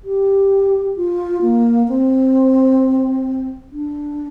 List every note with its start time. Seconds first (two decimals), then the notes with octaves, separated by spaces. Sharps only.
0.04 G4
0.96 F4
1.42 A#3
1.88 C4
3.72 D4